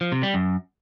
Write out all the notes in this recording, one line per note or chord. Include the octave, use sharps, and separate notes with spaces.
F3
C3
G3
F#2